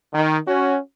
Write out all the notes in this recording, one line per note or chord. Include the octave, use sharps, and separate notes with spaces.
D#3
C#4 F#4